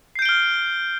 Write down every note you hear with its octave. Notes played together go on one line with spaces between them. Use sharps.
F6 G6 C7 D7 G7